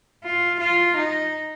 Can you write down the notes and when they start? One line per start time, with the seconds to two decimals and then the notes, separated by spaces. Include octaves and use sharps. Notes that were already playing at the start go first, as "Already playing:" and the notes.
0.24 F4
0.60 F4
0.97 D#4